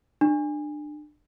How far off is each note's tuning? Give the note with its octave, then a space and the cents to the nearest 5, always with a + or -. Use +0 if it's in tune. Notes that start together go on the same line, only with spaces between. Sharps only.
D4 +25